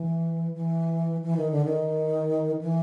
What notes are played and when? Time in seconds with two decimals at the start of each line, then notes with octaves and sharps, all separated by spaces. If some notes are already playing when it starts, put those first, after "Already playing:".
Already playing: E3
0.55 E3
1.23 E3
1.37 D#3
1.51 D3
1.65 D#3
2.61 E3